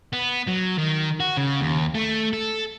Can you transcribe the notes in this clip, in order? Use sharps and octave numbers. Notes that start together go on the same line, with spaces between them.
B3
F#3
D#3
F#4
C#3
D#2
A3
A4